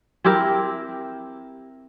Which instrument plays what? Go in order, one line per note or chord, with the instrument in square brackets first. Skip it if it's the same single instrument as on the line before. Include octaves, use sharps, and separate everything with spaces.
[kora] C4 E4 G4 A#4